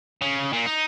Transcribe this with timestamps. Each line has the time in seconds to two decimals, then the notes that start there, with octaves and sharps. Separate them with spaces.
0.22 C#3
0.53 A#2
0.66 D#4